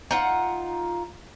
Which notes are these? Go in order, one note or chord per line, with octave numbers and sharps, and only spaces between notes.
D#4 F4 F#5